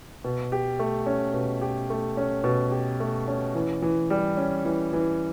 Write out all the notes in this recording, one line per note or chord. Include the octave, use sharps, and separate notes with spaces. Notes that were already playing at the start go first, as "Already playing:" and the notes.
B2
G4
A3
C#4
B2
G4
A3
C#4
B2
G4
A3
C#4
E3
E3
G3
C#4
E3
E3